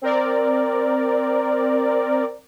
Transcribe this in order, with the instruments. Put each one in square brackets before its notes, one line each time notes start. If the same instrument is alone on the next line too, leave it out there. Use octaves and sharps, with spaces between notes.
[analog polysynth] C4 A#4 D5